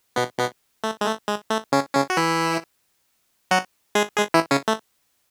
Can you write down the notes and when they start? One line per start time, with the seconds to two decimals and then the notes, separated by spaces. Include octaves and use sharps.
0.16 B2 B3
0.39 B2 B3
0.84 A3
1.01 G#3
1.06 A3
1.28 G#3
1.50 A3
1.72 C#3 C#4
1.95 C#3 C#4
2.10 F#4
2.17 E3 E4
3.51 F#3 F#4
3.95 G#3 G#4
4.17 G#3 G#4
4.34 E3 E4
4.51 C#3 C#4
4.68 A3